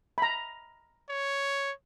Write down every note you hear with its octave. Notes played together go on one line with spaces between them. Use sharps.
A#5 B5
C#5